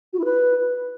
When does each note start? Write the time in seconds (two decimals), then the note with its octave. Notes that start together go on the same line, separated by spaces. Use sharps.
0.13 F#4
0.19 E4
0.25 B4